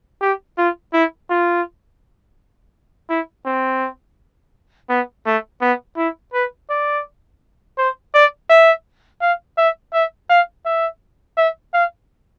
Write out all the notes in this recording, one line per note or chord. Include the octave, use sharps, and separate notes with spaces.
G4
F4
E4
F4
E4
C4
B3
A3
B3
E4
B4
D5
C5
D5
E5
F5
E5
E5
F5
E5
E5
F5